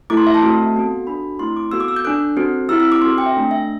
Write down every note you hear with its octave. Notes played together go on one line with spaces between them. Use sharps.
A3 E4 A4 D6
C6
E5
A5
A3 C4 F#4 A4
B3 F#4 A4
D4 F#4 A4 B5
A3 C4 E4 C6
D6
B3 F#4 A4 E6
D6
E6
G6
D4 A4 F#6
C4 F#4 A4
C4 E4 G4 E6
E6
D6
C4 F#4 A4 C6
G5
E5
A3 D4 A4
E5